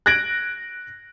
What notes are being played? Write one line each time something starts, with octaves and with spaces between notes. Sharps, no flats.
F#6 G#6 A#6 D7 F#7